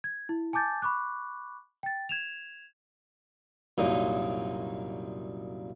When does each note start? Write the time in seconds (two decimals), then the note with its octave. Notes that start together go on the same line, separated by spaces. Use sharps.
0.04 G#6
0.29 E4
0.53 G#5 A5 D6 G6 A6
0.82 B5 C#6 D6 F#6
1.83 G5 A6
2.09 G#6 E7 F7
3.78 C2 F#2 A#2 D#4